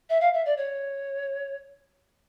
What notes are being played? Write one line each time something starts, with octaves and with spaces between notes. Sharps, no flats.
E5
F5
E5
D5
C#5